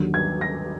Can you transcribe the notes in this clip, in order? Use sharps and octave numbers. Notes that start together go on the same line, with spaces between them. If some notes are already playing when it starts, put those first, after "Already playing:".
Already playing: D#2 D3 F#3
G#6
A#6